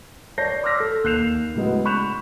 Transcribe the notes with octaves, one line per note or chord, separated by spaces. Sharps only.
C#5 D5 A5 G6 A#6 C7
C6 D6 E6 F6 A#6 B6
A4
D#2 F#6 G6 C7 E7 F7
A2 C#3 F#3 G#3 B3
B5 C#6 F#6 G6 E7 F7